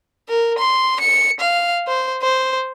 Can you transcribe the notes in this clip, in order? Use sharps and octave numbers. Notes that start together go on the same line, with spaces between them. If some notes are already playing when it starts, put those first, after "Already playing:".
A#4
C6
C#7
F5
C5
C5